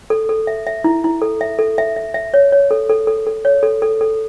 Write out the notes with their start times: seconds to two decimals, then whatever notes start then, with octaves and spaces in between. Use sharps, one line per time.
0.10 A4
0.29 A4
0.47 E5
0.67 E5
0.84 E4
1.04 E4
1.22 A4
1.41 E5
1.59 A4
1.78 E5
1.97 E5
2.14 E5
2.34 C#5
2.52 C#5
2.71 A4
2.90 A4
3.07 A4
3.27 A4
3.45 C#5
3.63 A4
3.82 A4
4.01 A4